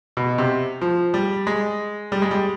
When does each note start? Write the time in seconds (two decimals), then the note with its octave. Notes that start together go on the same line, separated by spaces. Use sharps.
0.17 B2
0.38 C3
0.82 F3
1.14 G3
1.47 G#3
2.12 G3
2.22 G#3
2.31 G3